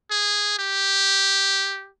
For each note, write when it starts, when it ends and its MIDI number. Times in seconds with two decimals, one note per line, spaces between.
0.11 0.58 68
0.59 1.89 67